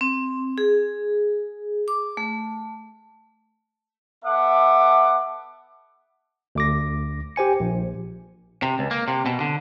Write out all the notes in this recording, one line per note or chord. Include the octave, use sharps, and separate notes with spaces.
C4
G#4
D6
A3
B3 A4 E5 F#5 D6
D2 D6 A#6
G4 C5 G#5 C#7
A#1
C3
C#2
A#3
C3
B2
D3